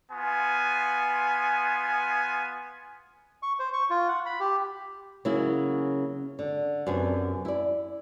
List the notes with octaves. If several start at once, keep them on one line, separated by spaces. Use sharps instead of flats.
B3 F4 G#5
C#6
C5
C#6
F4
F#5
B5
G4
C#3 F#3 A#3 C#4 E4
D3
F#2 C3 B3 D4 G#5
E4 D5